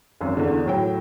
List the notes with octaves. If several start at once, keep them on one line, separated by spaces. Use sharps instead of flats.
G#1 F#2
E2 D3
A2 F#3 G5